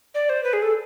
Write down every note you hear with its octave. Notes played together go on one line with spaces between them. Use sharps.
D5
C5
B4
G#4
A4